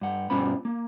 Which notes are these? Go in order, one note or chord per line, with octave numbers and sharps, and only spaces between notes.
G2 F#5
G2 B2 C#4 F4 C5 B5
A#3